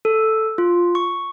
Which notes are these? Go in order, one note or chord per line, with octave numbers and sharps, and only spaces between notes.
A4
F4
C#6